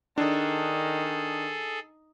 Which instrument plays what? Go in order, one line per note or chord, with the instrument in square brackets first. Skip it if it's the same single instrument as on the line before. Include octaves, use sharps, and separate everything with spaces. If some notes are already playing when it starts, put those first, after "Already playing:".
[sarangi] D#3 [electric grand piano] D4 [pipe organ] G#4 A4